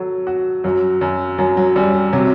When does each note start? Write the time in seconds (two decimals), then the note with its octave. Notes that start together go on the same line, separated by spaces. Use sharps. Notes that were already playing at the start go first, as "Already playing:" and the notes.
Already playing: F#3 A4
0.27 F#4
0.64 F#2 F#3
1.01 F#2
1.38 F#2 F#3
1.57 F#3
1.76 F#2 G3
1.95 G3
2.13 C3 F#3